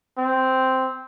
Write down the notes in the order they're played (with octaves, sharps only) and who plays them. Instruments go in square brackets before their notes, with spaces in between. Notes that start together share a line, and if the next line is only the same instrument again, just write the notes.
[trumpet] C4